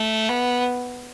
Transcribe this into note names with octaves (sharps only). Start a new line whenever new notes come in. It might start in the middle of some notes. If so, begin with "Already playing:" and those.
Already playing: A3
B3